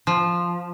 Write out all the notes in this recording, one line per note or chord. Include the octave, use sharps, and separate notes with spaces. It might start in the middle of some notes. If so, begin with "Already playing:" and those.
F3